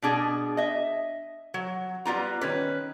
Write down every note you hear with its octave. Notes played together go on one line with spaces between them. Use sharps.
B2 D4 G#4
D#5 E5
F#3
G3 B3 F4 A#5
D#3 C#4 B4